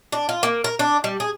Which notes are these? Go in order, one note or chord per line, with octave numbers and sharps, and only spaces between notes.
D4
F4
A#3
A#4
D4
G3
G#4